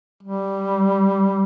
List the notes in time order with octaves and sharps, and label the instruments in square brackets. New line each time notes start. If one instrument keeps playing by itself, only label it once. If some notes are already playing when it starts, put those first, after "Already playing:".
[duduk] G3